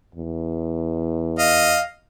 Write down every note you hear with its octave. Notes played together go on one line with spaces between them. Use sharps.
E2
D#5 F5